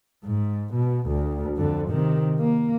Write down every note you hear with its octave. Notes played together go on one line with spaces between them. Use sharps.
G#2
B2
D2
F2 D3
C3 D#3
A#3